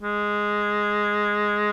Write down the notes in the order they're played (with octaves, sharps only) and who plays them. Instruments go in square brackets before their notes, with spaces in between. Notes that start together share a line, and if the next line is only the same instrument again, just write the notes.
[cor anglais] G#3